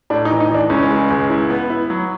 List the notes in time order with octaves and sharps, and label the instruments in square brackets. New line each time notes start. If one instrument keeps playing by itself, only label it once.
[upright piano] A2 [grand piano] D4
[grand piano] D#4
[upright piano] E3
[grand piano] D#4
[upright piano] E3 [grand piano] D4
[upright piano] C#2 [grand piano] C#4
[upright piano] G#3
C#2
E4
B3
E4
F#3